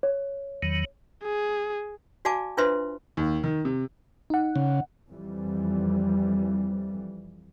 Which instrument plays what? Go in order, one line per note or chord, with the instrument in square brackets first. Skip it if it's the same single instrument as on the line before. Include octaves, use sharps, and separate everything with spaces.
[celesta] C#5
[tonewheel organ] E2 D#3 F#3
[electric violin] G#4
[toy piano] F#4 D5 F5 G#5 A5 D6
D4 F4 B4 C5 E5 C6
[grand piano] D#2
D#3
C3
[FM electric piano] D#4 F#5
[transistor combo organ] C#3
[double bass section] F2 E3 G3